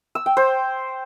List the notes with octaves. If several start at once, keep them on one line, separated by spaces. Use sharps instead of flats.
E6
G5
C5